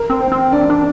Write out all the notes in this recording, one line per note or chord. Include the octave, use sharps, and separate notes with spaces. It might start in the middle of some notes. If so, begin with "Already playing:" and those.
Already playing: A#4
C4
C5
C4
D4 D5
D4